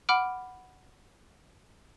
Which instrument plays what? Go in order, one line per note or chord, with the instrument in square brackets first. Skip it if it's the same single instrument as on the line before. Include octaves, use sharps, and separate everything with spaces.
[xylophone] F#5 B5 D6 F6 D7